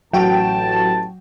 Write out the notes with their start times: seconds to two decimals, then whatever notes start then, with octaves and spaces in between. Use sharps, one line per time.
0.13 A1 F#3 F#4 G5 A5